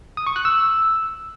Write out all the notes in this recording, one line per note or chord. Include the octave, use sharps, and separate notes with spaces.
D#6
C#6
F#6
E6